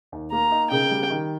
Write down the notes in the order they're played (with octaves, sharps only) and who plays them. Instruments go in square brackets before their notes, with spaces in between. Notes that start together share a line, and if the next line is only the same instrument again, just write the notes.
[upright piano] D#2
[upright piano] A#3 [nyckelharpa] A#5
[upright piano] D#4
[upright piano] C#3 [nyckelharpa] G5
[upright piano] G3
D#3